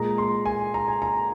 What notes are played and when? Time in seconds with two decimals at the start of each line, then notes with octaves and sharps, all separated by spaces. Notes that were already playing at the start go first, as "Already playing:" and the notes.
Already playing: A#2 G#3 A#5
0.18 C6
0.46 G#5
0.74 A#5
0.88 G#5
1.02 A#5